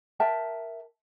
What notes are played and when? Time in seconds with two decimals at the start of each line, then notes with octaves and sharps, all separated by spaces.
0.20 A#4 E5 G5 A5